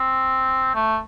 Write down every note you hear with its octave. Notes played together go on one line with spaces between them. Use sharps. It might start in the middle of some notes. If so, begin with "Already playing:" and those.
Already playing: C4
A3